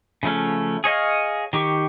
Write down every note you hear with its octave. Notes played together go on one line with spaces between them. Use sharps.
C#3 F3 A3 C#4
G#4 C#5 D#5 F5
D#3 G4 C#6